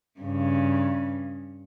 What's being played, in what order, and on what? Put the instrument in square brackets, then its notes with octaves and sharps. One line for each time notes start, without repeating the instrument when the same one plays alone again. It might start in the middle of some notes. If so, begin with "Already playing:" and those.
[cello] G2 C#3